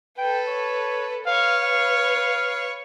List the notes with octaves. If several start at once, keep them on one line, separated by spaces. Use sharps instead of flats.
A4 B4 G5
C#5
B4 C#5 F5
F5